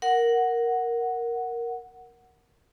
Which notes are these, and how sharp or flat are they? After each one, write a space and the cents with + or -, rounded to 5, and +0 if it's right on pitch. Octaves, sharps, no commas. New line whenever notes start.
A#4 +0 F#5 +0